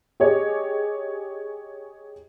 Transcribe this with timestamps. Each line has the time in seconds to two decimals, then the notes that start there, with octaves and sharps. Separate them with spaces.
0.20 G4 G#4 C#5 D#5